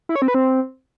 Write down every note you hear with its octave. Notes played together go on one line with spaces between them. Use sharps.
E4
C#5
C4
B4
C4